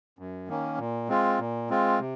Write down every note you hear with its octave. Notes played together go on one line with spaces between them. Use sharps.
F#2
D#3 A#3 C#4
A#2
G#3 C4 F4
A#2
G#3 C4 F4
C3